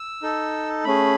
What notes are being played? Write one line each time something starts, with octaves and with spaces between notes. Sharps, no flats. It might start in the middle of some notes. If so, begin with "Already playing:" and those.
Already playing: E6
D#4 A4
A3 C#4 G#4 B5